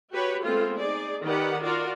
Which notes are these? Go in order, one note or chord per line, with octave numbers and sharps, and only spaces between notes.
F#4 G4 B4 C#5
G#3 A3 B3 C4 F4 A4
D#4 G#4 D5
D#3 G4 B4 D5 F#5
F4 F#4 A#4 D5